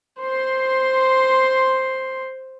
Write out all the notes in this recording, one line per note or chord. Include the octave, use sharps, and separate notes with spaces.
C5 C6